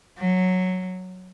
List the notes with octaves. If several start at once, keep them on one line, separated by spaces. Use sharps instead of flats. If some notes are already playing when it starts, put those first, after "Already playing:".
F#3